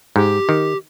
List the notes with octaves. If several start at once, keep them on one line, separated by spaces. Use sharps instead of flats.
G#2 G4
D#3